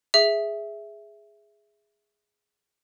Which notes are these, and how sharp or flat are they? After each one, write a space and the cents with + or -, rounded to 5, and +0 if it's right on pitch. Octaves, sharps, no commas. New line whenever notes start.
G#4 +0 E5 +0